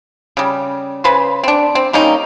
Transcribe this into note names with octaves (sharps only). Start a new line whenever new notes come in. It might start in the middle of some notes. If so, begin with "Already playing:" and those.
C#3 G3
C#3 B4 C5
C4 D4
C4
G3 A#3 C#4 D#4